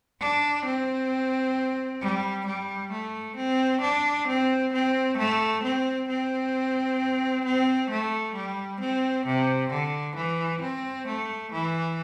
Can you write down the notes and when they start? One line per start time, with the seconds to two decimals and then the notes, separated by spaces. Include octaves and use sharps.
0.20 D4
0.65 C4
2.01 G3
2.46 G3
2.92 A3
3.37 C4
3.82 D4
4.28 C4
4.73 C4
5.17 A3
5.64 C4
6.09 C4
7.45 C4
7.90 A3
8.35 G3
8.80 C4
9.26 C3
9.71 D3
10.16 E3
10.61 C4
11.07 A3
11.52 E3